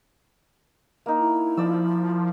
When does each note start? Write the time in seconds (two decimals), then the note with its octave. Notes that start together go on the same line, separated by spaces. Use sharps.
1.06 A#3 D#4
1.18 E4
1.57 F3 D5 E6